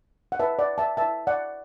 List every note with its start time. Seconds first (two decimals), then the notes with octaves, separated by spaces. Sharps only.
0.32 F#5
0.40 E4 B4 E5 A5
0.59 D5 F#5
0.78 E5 A5
0.97 E4 B4 E5 A5
1.27 D5 F#5